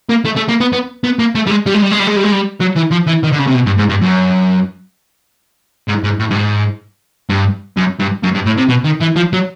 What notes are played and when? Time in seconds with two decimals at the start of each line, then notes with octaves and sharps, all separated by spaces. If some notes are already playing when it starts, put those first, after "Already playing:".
0.10 A#3
0.25 A3
0.37 A3
0.49 A#3
0.61 B3
0.73 B3
1.04 B3
1.19 A#3
1.35 A3
1.47 G3
1.50 G#3
1.66 G3
1.74 G#3
1.82 G3
1.91 G#3
1.99 G3
2.07 G#3
2.16 G3
2.23 G#3
2.32 G3
2.60 F#3
2.76 E3
2.91 F3
3.07 E3
3.23 D#3
3.32 D3
3.39 C#3
3.47 C3
3.54 B2
3.66 G2
3.78 G#2
3.89 G2
4.01 F#2
5.88 G#2
6.04 G#2
6.19 A2
6.30 G2
6.35 G#2
7.30 G2
7.77 F#2
7.99 G2
8.23 F#2
8.34 G2
8.46 A2
8.57 C3
8.69 B2
8.85 D#3
9.01 E3
9.16 F3
9.33 F#3